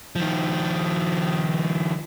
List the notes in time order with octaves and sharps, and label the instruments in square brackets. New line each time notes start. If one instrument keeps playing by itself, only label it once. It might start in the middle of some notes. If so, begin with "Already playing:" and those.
[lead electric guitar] D#3 F3